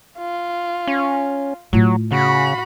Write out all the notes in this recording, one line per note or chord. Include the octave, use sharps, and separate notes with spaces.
F4
C#4
A2 F#3 F4
C#3 F#4 B5